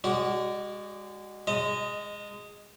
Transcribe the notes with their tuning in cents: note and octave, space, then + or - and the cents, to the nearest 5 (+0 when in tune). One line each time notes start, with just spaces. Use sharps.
G#3 -25 F#4 +20 D5 -10
G#3 -15 D#5 +5 A#5 -45